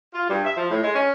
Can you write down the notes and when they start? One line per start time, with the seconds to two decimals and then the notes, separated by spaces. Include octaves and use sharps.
0.14 F4
0.29 G2
0.45 E5
0.57 F3
0.71 A2
0.83 G#3
0.95 C#4